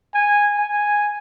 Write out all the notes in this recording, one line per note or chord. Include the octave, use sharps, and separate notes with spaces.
G#5
G#5